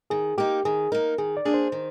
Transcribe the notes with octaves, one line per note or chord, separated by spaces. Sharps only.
D#3 G#4
A#3 D#4 G4
D#3 G#4
A#3 D#4 A#4
D#3 G#4
D5
A#3 D4 G#4
C5
D#3